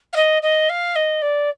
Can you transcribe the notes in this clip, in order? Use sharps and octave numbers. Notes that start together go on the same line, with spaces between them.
F5
D#5
D#5
F5
D#5
D5